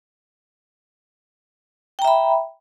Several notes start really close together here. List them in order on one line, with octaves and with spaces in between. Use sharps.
G5 A#5 E5 B5